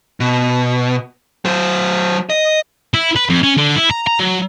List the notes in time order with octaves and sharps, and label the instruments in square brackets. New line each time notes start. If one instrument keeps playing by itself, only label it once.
[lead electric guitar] B2
F#3 C5
D#5
[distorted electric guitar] E4
B4
F2
C#4
D3
E4
A#5
A#5
F#3